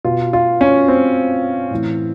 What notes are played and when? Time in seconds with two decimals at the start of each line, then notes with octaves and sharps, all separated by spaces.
0.05 B2 F4
0.33 F4
0.61 C#4
0.88 C4
1.71 A2 E3